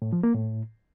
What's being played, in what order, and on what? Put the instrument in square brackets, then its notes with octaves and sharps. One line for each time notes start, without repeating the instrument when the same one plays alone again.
[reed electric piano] A2
F3
A#3
A2